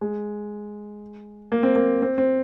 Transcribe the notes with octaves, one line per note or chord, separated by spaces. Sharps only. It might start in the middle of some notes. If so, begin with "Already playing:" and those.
G#3
A#3
C4
A#3
C4
C4